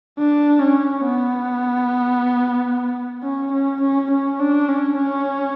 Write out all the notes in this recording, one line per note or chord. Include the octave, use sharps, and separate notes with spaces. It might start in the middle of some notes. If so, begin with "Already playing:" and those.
D4
C#4
B3
C#4
C#4
C#4
C#4
D4
C#4
C#4